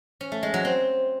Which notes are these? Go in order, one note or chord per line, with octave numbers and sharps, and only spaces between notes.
C#4
A3
G#3
F#3
C4